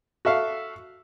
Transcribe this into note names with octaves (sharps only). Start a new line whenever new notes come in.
F#4 A4 E5 F5